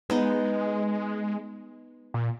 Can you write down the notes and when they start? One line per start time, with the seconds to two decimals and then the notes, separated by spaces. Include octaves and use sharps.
0.10 G#3 B3 D#4 D#5
2.14 A#2